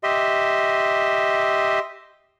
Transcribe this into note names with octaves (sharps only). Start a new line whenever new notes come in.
G4 D#5 E5 C6